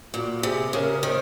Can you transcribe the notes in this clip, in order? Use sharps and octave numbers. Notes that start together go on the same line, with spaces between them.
A#2 F#4
C3 G#4
C#3 A#4
D#3 C5